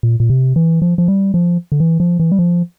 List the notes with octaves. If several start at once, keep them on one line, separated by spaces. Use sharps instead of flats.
A#2
A#2
C3
E3
F3
F3
G3
F3
D3
E3
F3
E3
G3
F3